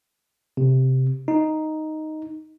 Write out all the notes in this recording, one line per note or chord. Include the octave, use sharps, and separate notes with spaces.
C3
D#4